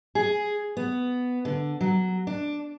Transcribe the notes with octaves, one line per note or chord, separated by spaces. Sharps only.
G#4
B3
D3
F#3
D4